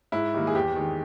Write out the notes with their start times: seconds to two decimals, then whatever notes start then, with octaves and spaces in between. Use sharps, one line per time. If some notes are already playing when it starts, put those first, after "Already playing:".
0.12 G#2 E4
0.34 D#3 G3 A#3
0.47 G#4
0.55 E2 G4
0.76 D#3 G#3